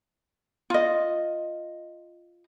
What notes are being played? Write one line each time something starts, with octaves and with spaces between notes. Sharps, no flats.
F4 D#5